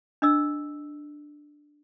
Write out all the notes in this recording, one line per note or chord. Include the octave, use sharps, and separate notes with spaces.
D4 D#5 E6